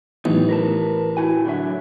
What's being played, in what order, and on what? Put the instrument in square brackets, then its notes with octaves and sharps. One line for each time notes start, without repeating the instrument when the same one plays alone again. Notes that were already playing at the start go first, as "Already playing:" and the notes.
[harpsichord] A1 [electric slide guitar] F#3 B3 D#4
[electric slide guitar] A#4 B4 A5
E4 F#4 G#5
D3 F#3 E5